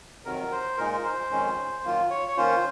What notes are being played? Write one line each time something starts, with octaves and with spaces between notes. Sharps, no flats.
F2 C3 D#3 F#3 A#4
C5
A#2 G#3 D#4 A#4
C5
F2 D#3 G#3 C#4
F#2 D#3 A#3 F4
C#5
C#5
D#3 A#3 C#4 F4 C5